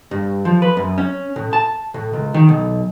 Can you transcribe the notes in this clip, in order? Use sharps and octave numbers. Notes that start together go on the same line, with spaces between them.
G2
F3
B4
F#2
C#4
A2
A5
A2
C#2
D#3
B1